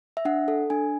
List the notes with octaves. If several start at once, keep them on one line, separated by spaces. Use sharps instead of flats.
E5
D4 F#5
A4
D4 G#5